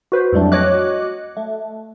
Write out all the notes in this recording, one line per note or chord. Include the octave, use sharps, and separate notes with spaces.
F#4 B4 C5
F2 A2 F#3 G3 A3 D4
F#4 C#5 D#5 D6 F#6
A3